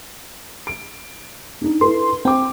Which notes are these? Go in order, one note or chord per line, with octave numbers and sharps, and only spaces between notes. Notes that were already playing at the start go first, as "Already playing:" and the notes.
D7
D4 D#4
E4 A4 B4 C6
C4 G5 D6